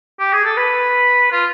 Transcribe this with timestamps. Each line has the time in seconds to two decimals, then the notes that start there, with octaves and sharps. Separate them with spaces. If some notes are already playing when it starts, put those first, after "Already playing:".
0.20 G4
0.33 G#4
0.45 A4
0.57 B4
1.32 F4